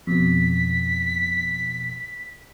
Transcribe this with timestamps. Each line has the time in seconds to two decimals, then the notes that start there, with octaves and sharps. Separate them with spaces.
0.07 F2 B2 B6